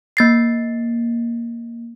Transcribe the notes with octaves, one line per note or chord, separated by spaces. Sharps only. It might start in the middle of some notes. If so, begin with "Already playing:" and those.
A#3 A6 C7